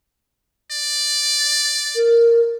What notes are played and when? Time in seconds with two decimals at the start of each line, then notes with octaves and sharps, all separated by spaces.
0.71 D5
1.96 A#4